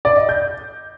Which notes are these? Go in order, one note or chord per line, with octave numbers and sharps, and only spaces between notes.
D5
D#5
G6